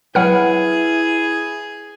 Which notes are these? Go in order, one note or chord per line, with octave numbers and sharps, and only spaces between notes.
F#3 E4 G#4 B4 F#5 F6